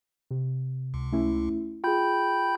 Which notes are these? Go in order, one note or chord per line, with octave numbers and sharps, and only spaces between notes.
C3
C#2
A3 C#4 E4
F4 G#4 G5 B5 G6